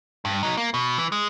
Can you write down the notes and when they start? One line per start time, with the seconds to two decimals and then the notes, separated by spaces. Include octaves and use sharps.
0.25 G2
0.43 F#3 D#4
0.57 A#3
0.74 B2
0.98 E3
1.12 G#3